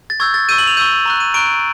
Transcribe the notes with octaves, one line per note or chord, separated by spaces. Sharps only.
A6
C#6 E6 G6 G#6
A6
C#6 E6 G6 D#7
F#7
F7
C#6 E6 G6 D#7
A#5 C#6 F#6
D#7
A#5 C#6 F#6 D7